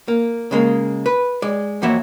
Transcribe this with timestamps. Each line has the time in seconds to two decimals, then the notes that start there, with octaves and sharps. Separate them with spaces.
0.08 A#3
0.51 C#3 G#3 A#3
1.06 B4
1.42 G#3 D5
1.82 F2 E3 A#3 F#4 C#5 E5